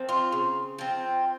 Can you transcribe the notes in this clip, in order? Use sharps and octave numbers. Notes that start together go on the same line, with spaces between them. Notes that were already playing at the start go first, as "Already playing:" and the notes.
Already playing: F3 C4
F4
C#3
F3 C4